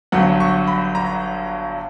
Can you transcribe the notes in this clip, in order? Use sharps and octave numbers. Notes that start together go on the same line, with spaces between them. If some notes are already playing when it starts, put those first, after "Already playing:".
G1 G2 F#3 F#5
C#6
B5
A#5